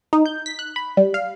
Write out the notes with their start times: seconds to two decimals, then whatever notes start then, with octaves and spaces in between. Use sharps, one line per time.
0.13 D#4
0.26 G6
0.46 B6
0.59 F#6
0.76 B5
0.97 G3
1.14 F5